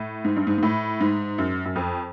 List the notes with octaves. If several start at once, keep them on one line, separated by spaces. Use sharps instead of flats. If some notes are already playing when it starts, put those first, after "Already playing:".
Already playing: A2
G#2
G2
G#2
G#2
A2
G#2
F#2
F#2
F2